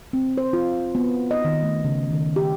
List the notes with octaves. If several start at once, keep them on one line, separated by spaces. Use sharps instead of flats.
C4
C5
F4
B3
D#5
D#3
A3
C#3
D#3
G4